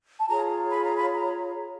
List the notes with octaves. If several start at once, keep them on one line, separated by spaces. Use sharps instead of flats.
A5
F4 G#4 C#5 A#5
B5
A#5
B5
A#5